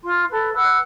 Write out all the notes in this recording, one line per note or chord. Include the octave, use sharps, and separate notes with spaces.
F4 C6
A4 B4
B4 F#5 E6 F#6